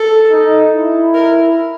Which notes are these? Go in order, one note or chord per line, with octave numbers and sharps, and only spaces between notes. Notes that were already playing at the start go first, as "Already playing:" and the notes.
Already playing: A4
D#4
E4
A#4